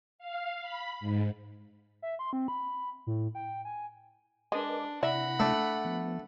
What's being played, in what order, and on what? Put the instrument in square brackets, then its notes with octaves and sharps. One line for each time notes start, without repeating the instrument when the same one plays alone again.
[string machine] F5
B5
G#2
[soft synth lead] E5
C6
C4
B5
A2
G5
G#5
[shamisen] G#3 D#5 [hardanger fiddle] D4 [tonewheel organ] A#4 B4 D6
[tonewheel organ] C3 E4 A#6 [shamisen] D5 E5 [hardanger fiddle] F#5 B5
[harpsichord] A3 D4
[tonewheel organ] F3 B3